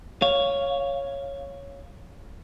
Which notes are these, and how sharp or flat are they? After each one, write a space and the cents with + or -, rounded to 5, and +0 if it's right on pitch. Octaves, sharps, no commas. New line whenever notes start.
C#5 +0 F5 +0